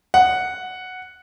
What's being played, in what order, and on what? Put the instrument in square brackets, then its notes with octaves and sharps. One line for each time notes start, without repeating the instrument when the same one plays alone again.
[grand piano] F#5